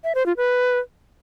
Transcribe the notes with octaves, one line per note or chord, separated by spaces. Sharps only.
E5
C5
F4
B4